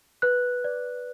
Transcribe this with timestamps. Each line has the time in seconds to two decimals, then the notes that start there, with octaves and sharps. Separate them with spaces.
0.22 B4 F#6
0.64 D5